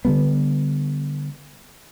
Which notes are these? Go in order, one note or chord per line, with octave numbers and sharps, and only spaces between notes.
D3 D#3 G3 B3